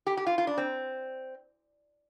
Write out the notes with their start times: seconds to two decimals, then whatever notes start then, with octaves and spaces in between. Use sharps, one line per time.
0.07 G4
0.17 G4
0.27 F4
0.38 F4
0.47 D4
0.58 C4